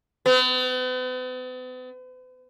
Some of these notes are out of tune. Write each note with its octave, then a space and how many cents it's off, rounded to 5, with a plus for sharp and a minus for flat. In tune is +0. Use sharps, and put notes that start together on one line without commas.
B3 +45